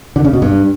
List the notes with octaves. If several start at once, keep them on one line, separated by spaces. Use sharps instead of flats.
D3
C#3
B2
G2